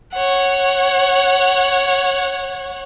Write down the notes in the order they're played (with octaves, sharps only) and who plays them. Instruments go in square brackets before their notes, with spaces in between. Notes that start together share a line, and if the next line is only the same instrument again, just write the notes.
[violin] C#5 F#5